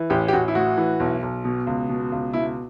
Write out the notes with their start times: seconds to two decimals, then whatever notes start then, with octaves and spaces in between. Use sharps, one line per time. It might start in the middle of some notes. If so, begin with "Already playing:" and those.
Already playing: E3
0.10 A1 G4
0.28 G4
0.33 A1 F#4
0.48 E4
0.55 A2 F#4
0.77 E3
1.00 B1
1.22 B1
1.44 B2
1.67 C#2
1.89 B2
2.12 C#2
2.33 B2 E4